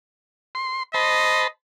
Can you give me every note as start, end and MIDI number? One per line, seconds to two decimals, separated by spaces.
0.55 0.83 84
0.94 1.47 72
0.94 1.48 75
0.94 1.47 81
0.94 1.47 83